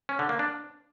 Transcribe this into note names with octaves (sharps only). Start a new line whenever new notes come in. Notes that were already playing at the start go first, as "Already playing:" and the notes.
C#4
D3
A#3
D4